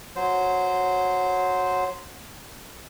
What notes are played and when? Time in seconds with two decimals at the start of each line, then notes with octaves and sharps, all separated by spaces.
0.16 F#3 C5